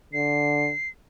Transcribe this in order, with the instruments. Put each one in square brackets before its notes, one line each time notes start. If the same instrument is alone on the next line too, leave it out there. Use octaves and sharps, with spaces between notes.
[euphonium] D3 [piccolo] C7